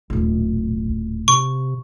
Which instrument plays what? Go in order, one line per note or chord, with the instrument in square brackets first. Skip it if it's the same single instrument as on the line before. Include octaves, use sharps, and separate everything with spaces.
[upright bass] D#1 A2 [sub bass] B1
[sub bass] C3 [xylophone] C#6